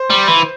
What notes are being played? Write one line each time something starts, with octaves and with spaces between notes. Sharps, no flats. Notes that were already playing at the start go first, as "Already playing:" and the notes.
Already playing: C5
G3
E3